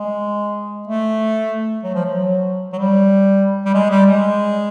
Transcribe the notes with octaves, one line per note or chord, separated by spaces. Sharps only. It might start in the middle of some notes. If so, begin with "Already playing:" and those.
Already playing: G#3
A3
F#3
F3
F#3
F#3
G3
G3
G#3
G3
G#3